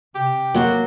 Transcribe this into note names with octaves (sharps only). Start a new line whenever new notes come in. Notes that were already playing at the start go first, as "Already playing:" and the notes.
C3 G4
F#3 A#3 F#4 C5